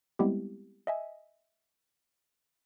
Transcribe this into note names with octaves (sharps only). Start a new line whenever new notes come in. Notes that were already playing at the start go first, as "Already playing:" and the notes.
G3 G#3 B3 C4 E4 G4
D#5 E5 G#5